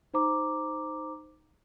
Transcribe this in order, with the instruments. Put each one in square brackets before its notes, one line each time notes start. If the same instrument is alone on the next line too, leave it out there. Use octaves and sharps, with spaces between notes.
[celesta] D#4 C5 A#5 D6